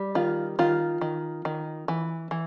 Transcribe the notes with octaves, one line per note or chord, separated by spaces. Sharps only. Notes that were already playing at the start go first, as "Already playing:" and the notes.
Already playing: G3
D#3 F4
D#3 F4
D#3
D#3
E3
E3